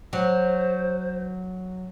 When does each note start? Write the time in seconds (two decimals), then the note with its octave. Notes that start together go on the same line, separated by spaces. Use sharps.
0.13 F#3 C5